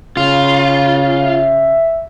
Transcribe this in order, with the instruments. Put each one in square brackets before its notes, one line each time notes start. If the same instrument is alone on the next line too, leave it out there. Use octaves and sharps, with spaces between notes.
[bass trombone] C#3 [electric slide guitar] F4
[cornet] E5